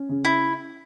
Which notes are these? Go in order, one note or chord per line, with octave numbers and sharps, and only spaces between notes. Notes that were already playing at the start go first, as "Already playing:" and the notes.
Already playing: C#4
C#3
E4